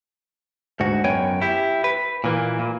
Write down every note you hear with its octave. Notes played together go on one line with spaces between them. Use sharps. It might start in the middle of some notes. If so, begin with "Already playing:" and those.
D2 G#2 F#4
F#2 B3 C#5 G5 G#5
E4 G4
B4
A#2 E3 A#3
A#2